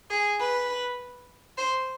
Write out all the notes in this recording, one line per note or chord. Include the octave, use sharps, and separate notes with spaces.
G#4
B4
C5